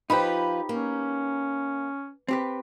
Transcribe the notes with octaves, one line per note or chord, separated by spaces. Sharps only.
F3 D#4 F4 G4 B4 B5
A#3 C#4
C4 G4 B4